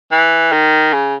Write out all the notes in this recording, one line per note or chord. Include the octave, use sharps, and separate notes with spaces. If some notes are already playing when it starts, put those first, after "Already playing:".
E3
D#3
C#3